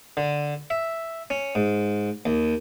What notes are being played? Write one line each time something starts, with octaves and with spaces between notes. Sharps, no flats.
D3
E5
C#4
G#2
D#2